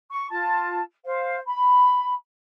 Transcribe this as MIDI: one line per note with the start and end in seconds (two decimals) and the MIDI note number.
0.11 0.26 85
0.30 0.79 65
0.30 0.79 81
1.04 1.37 72
1.04 1.37 77
1.45 2.13 83